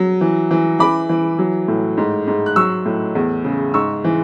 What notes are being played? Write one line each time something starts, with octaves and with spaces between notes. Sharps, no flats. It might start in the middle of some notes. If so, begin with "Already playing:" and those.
Already playing: F#3
E3
E3
E3 B5 D6
E3
F#3
A2
G#2
G#2
F#6
F#3 C#6 E6
A2
E2
C#3
G#2 C#6 E6
E3